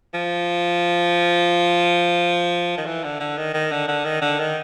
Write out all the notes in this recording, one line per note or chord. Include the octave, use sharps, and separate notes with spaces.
F3
D#3
E3
D3
D3
D#3
D#3
D3
D3
D#3
D3
D#3